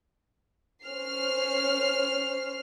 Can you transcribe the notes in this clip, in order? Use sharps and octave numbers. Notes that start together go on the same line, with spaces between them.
C#4 C5 F6 C7